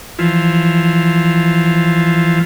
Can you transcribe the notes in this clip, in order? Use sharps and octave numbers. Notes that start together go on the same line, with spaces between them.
E3 F3